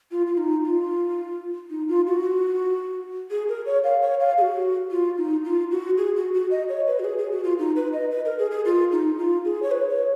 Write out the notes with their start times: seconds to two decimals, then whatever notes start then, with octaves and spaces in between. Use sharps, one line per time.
0.11 F4
0.27 F4
0.38 D#4
0.64 F4
1.70 D#4
1.89 F4
2.07 F#4
3.31 G#4
3.49 A#4
3.66 C#5
3.84 F5
4.02 C#5
4.20 F5
4.38 G#4
4.42 F#4
4.91 F4
5.18 D#4
5.45 F4
5.71 F#4
5.98 G#4
6.16 F#4
6.34 F#4
6.51 D#5
6.69 C#5
6.87 B4
7.00 F#4
7.04 G#4
7.18 G#4
7.32 F#4
7.44 F4
7.59 D#4
7.76 B4
7.93 D#5
8.11 B4
8.25 A#4
8.39 G#4
8.51 G#4
8.65 F4
8.92 D#4
9.19 F4
9.45 G#4
9.63 C#5
9.71 B4
9.90 C#5